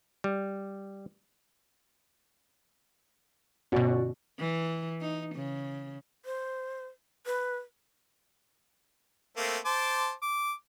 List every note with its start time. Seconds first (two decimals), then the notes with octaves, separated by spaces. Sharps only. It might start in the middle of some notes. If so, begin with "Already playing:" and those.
0.24 G3
3.72 G1 B2 C#4 F#4 D5
4.40 E3
5.01 D#4
5.35 C#3
6.25 C5
7.26 B4
9.37 A3 A#3 C4
9.65 C5 A5 D6
10.23 D6